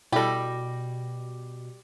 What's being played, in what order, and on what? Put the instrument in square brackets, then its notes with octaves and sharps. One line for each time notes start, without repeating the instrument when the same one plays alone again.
[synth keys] B2 [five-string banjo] G3 G4 [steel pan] E4 A4 [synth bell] G5 A#6